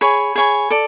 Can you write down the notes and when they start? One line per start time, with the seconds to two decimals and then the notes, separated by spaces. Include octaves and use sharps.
0.01 G#4 C#5 G#5 B5
0.35 G#4 C#5 G#5 B5
0.70 A4 D5